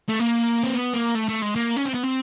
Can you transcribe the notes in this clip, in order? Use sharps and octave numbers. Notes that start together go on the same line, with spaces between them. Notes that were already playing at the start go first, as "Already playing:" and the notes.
A3
A#3
C4
B3
A#3
A3
A3
G#3
A#3
C#4
C4
B3
C4